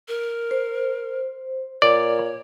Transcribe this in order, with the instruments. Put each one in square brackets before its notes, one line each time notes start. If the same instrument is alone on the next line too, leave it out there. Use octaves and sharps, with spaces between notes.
[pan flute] A#4
[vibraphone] C5
[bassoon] A#2 [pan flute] C#5 [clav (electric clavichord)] D5